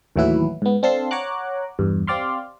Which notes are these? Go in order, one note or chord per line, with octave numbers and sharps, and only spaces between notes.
D#2 A2 E3 F#3 E4 B4
G#2 B3
C4 D4 A4 F5 A5 C6
C#5 F#5 A#5 D6 F#6
E2 G2
C4 G4 D5 F5 C6